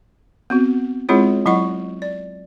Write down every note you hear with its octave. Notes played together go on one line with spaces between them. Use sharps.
B3 C4 F#4
G#3 C4 E4 F4 G#4 C#5
F#3 E4 D#5 F#5 C#6
D5